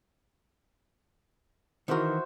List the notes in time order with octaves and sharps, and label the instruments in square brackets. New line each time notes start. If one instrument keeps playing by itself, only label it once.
[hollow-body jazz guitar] D#3 E3 A#4 [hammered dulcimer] F#4 C5 E5